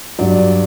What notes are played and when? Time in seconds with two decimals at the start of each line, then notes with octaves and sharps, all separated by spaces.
0.19 G2 F#3 D5